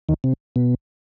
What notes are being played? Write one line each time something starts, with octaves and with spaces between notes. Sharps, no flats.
D#2 D#3
C3
B2